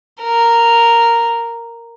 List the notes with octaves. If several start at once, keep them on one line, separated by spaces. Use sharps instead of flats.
A#4